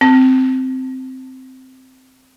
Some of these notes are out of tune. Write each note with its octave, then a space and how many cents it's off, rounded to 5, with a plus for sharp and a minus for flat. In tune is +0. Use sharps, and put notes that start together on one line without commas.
C4 -10